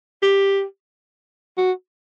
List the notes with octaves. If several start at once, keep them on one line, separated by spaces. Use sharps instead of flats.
G4
F#4